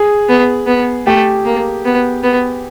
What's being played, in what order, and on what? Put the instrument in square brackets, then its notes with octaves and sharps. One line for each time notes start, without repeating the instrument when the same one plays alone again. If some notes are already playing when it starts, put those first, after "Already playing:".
Already playing: [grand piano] G#4
[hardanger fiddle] B3
B3
[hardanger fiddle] A3 [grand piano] G4
[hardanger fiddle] A#3
B3
B3